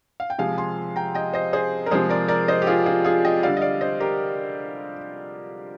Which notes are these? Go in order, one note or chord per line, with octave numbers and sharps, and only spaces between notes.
F5
G5
C3 F3 G#3 F5 G#5
G#5 C6
G5 A#5
D#5 G5
C5 D#5
G#4 C5
A#4
C3 F3 G#3 G#4 C5
A#4 D5
A#4 D5
C5 D#5
G4
F4 G#4
F4 G#4
F4 G#4
D#5 G5
D3 G3 D5 F5
D#5
D5 F5
C5 D#5
G4 A#4